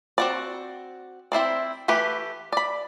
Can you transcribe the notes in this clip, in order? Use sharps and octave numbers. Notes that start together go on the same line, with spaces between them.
C4 F#4 D5
C4 E4 C5 D5
E3 A3 G4 B4
D5 B5